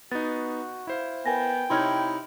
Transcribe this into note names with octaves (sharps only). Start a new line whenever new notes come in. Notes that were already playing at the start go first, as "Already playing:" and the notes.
B3 D#4 F#4 A6
E4 C5 F5
B3 A#4 G5 G#5 A#6
C3 D#4 E4 C#5 C6 F6 G#6